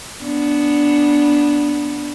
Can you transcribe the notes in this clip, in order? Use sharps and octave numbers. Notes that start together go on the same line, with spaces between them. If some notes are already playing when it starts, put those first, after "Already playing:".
B3 D4